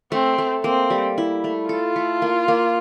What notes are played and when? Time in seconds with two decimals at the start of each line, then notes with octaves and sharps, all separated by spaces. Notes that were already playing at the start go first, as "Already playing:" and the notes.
0.12 A3 C4
0.38 A3
0.64 A#3 C4
0.90 G3
1.18 E4
1.44 A3
1.69 F4 A4
1.96 A3
2.22 A#3
2.48 A#3